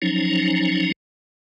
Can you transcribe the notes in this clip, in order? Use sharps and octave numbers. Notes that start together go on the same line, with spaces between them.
F3 F#3 C#4 D#4